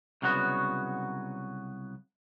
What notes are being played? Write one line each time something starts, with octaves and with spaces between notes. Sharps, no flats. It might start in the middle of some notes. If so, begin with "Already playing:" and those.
C2 C#3 F#3 B3 F#4